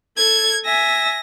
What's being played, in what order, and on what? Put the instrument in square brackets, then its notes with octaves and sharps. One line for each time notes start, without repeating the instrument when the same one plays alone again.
[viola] A4 [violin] G#6
[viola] E5 G#5 [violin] A#6